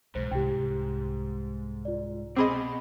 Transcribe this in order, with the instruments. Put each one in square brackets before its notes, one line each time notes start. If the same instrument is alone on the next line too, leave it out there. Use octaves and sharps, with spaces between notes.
[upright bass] B1 [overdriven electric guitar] G#2 [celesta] C5
[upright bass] C2 [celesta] G4 G5
[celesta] F4 D5
[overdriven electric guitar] B2 [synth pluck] C4 G#4 D#5 [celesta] B5 D6